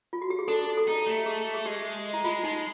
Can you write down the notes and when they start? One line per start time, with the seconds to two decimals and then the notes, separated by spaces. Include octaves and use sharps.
0.13 F4
0.22 F#4
0.30 G4
0.39 G#4
0.48 D4 A4
0.77 A4
0.88 D#4
1.06 A3 G4
1.26 G#4
1.54 G#4
1.66 G#3 G4
2.13 E4
2.24 G#3 F4
2.43 G#3 D#4